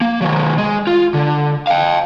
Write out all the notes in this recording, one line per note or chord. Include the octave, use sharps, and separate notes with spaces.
A#3
D#3 F#3
G#3
F4
D3
F5 G5